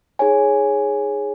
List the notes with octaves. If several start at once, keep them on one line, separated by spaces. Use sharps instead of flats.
D#4 G#4 C#5 G#5